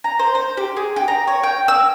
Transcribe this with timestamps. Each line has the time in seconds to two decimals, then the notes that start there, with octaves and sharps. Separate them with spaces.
0.04 A#5
0.19 C5
0.35 C5
0.57 G4
0.76 G#4
0.96 G4
1.08 A#5
1.27 C#5
1.43 G5
1.68 E6